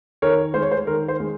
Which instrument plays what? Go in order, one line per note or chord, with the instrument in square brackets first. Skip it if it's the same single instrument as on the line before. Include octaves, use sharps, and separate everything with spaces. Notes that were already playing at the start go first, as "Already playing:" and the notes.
[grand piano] D#3 A#4 C#5
G#3 C5
C#5
C5
D#3 A#4
C5
G#3